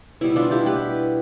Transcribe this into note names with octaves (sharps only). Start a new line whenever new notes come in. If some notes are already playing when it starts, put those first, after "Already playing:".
B2 G3 B3 E4
D4 F4
E4 G4
G4 B4